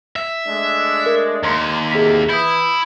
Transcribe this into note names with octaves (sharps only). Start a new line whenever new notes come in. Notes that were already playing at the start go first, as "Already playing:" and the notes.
E5
G#3 A3 D4
A#4
D#2 A#5 C6
D2 A2 C3 G#4 B6
E3 E4 D#6 G6